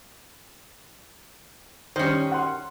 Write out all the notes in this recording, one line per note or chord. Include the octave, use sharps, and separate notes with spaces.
D#3 G3 C#4 C5
F#5 C6